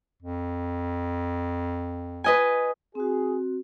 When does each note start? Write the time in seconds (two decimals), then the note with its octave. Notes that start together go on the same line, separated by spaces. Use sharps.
0.22 F2
2.24 B4 D#5 G#5
2.95 C4 F#4 G#4